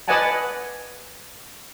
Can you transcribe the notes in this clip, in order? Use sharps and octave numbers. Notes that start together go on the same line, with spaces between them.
B4 D5 D#5 F#5 G#5 A5